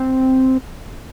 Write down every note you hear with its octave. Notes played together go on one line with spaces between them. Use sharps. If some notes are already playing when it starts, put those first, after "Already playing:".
Already playing: C4